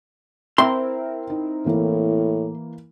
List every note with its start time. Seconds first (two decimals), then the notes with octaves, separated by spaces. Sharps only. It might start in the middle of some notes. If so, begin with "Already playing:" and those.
0.58 C4 E4 A#4 E5 C6
1.30 D#4
1.66 A2 E3 A#3